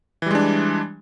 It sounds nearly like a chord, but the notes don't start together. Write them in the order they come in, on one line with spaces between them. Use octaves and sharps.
E3 G3 G#3 D4